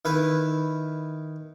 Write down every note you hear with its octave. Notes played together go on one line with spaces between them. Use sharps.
D#3 E4 B4